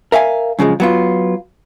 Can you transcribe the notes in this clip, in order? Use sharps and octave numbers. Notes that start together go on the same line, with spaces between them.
A#4 E5 F5 G#5
F#2 C#3 F3 G#3
F#3 B3 F4